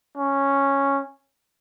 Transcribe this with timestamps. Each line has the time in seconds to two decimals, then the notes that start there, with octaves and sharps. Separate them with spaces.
0.18 C#4